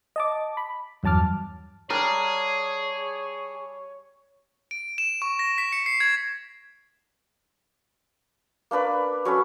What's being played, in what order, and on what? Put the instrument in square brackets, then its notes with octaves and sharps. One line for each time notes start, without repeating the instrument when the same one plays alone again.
[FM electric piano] D#5 A5 D6
B5
E2 G2 F#3 A5 D6 F6
[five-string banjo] G3 D4 A#4 [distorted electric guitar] G#4 [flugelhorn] C#5
[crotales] D7
E7
C#6
A#6
B6
C#7
C7
G#6
[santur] A#3 D4 B4 D5
F#3 C#4 A4 B4